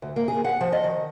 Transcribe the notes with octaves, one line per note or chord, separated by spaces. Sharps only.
D2
A#3
G#4
F#5
F3
D#5
D#3